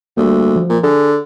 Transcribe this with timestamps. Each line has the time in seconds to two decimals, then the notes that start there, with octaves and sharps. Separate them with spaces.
0.17 D2 G3 A#3
0.56 F3
0.69 A#2
0.84 D3 G#4